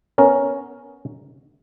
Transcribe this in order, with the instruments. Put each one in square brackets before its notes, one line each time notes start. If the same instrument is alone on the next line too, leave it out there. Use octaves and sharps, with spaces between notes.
[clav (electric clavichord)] B3 C#4 A#4